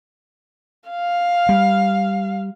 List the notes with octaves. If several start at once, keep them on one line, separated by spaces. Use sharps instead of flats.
F5
G3